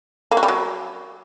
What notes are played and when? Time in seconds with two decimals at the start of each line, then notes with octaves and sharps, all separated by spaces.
0.31 A#3
0.37 F#4
0.43 G3
0.48 F#3